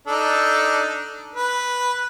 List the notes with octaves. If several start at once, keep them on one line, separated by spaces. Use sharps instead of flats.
D4 D#4 A4
B4